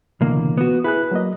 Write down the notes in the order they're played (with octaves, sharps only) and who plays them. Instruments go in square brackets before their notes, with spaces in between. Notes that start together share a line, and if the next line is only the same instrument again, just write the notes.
[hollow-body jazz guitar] C#2 A#3 [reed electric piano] B2 D3 E3
[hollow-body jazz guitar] B3 F#4
[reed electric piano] E4 G#4 F#6 [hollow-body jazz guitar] B4
[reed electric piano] F#3 A#3 D#5